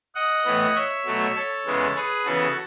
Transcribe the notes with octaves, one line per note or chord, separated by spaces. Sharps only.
D#5 F#5
A2 E3 B3
C#5 E5
B2 F#3 A3
A4 C#5
E2 C#3 G#3 B3
G#4 B4
C#3 E3 B3 F#4 A4